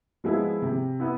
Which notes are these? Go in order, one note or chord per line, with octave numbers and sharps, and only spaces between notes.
F3 G#3 B3 E4
C3
B3 E4